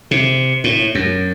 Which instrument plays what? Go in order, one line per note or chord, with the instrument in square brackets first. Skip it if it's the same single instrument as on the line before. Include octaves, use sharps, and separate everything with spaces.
[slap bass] C3
A2
F#2